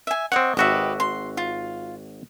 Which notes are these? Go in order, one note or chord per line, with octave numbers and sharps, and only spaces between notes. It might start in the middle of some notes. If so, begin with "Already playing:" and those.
E5 G#5
C4 C#5 D#5 F#5
G#1 F#4 G4 B4 D#5 E5
C6
F4